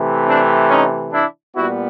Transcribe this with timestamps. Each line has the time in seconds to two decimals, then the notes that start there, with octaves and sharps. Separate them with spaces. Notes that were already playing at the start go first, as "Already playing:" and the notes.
Already playing: C3 E3 A3
0.28 C4 D4
0.70 C#4 D#4
1.13 D4 E4
1.55 A#2 G3 B3 E4 F#4